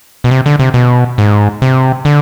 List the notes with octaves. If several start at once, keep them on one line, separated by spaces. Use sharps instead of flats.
B2
C3
D3
C3
B2
G#2
C3
D3